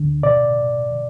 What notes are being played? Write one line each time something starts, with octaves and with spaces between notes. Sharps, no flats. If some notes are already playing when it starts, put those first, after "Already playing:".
Already playing: D2 D3
B2 D5